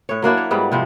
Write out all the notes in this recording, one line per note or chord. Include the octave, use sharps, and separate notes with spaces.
A2 C#5
F#3 A#3 D4 E4
C#5
G#2 G3 B3
C3 F3 C4